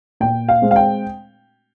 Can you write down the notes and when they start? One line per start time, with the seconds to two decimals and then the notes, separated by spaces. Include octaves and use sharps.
0.20 A#2 G5
0.49 F5
0.62 G#3 C4
0.71 F5
0.76 G5